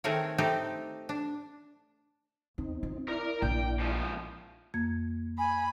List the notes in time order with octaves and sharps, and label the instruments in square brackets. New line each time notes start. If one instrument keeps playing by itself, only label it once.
[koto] D#3 A3 C4 G#4 A#4 C#5
A3 C4 D#4 G4
D4
[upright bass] E2 [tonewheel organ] C4 D#4
[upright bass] F4
[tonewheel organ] E4 D5 [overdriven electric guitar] A#4 A#5
[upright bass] A#1 [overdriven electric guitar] G5
[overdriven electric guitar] G#2 F3
[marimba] F2 A#3 G#6
[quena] G#5 [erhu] B5